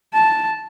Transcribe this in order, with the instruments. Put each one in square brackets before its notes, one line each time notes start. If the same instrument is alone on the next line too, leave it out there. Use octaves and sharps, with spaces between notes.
[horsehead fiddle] A5